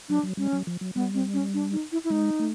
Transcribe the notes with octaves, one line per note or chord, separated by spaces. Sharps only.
F#3 D4
F#3
G3 C#4
F#3
F3
F#3
G3 B3
C4
C#4
D4
D#4
E4
E4
G#3 D#4
A3